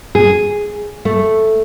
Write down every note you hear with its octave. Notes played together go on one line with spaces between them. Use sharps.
G#4
A3